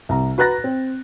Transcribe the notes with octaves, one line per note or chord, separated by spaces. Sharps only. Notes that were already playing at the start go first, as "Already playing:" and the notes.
C2 A#5
F#4 B4 A#5 F#6 A6 A#6
C4